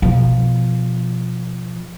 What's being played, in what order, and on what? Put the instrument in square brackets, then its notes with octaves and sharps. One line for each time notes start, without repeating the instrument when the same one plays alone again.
[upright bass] B2 F3